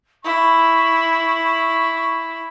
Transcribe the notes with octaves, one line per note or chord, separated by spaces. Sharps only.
E4 C#6